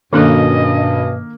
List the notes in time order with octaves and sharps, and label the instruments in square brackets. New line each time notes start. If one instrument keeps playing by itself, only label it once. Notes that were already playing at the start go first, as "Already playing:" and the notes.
[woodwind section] G2 B2 [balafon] D#3 D4 A4 [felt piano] A#3 [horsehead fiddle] C#4 D#5